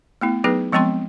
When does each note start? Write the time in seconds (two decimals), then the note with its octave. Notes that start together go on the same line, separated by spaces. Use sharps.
0.21 A3 B3 E4
0.44 F#3 B3 D#4 G#4 B4
0.72 F3 G#3 B3 C4 G5 C6